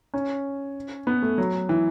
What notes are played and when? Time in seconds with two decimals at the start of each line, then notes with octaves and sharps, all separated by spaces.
0.14 C#4
1.07 B3
1.22 A3
1.38 F#3
1.69 E3